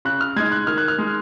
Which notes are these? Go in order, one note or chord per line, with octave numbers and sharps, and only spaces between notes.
C#3 F#6
F6
G#3 D#4 G#6
F#6
D#3 F6
F#6
F6
G#3 D#4